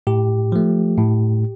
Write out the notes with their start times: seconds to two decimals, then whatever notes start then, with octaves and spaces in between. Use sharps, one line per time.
0.07 A2 G4
0.52 F3 A3
0.98 A2